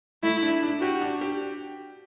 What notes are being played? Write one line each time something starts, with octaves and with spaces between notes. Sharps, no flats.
A3 E4
D4
D4
F#4 G4
D4
G4